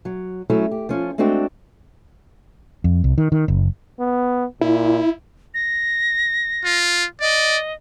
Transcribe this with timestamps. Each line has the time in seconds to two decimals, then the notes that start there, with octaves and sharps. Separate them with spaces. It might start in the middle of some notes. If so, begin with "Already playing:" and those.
0.05 F#3
0.50 F#3 A3 C#4 E4
0.71 G4
0.89 F3 C#4 F4
1.18 G#3 A3 C4 D4 F#4 G5
2.84 F2
3.04 C2
3.18 D#3
3.32 D#3
3.48 F#1
4.00 B3
4.61 A#2 E4
5.54 A#6
6.64 F4
7.21 D5 D#5